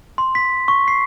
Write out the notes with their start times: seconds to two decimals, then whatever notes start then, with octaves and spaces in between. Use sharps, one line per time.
0.18 C6
0.35 B6
0.68 C#6
0.88 C7